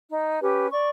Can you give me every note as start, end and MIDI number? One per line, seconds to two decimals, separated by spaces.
0.09 0.40 63
0.42 0.67 61
0.42 0.67 67
0.42 0.67 71
0.71 0.89 74
0.71 0.89 85